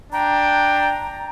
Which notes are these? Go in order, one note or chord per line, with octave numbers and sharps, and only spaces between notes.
D4 G5 A#5